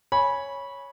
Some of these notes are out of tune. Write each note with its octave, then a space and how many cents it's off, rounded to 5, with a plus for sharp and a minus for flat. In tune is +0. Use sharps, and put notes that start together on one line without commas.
C#5 +0 G#5 +0 B5 -15